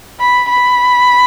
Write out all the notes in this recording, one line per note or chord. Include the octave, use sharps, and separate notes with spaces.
B5
B5